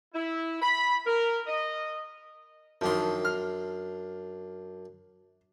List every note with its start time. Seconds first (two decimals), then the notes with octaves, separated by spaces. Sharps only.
0.14 E4
0.62 B5
1.06 A#4
1.47 D#5
2.81 F#2 D#3 F3 D4 C6
3.25 F6